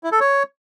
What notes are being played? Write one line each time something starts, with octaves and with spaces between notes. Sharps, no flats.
E4
A4
C#5